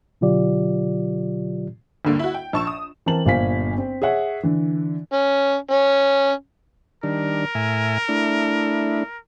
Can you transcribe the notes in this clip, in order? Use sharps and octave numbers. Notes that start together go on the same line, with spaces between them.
B2 D3 F#3 F4 G4 D5
D2 G2 D3 A#3
E4 F#4
G5
A#1 A5 C#6 E6 E7
D#6
E3 C4 A#4 A5 F#7
G1 A#2 C5 F5 G#5 B6
C4
G#4 C#5 E5 F#5
D3 E3
C#4
C#4
D#3 G3 D4 A#4
A2 E5 G#5
A3 D4 E4